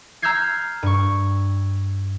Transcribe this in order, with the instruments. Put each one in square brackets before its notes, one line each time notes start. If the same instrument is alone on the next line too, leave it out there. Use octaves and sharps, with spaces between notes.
[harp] A#5 E6 F6 G6 G#6 C7
G2 C#6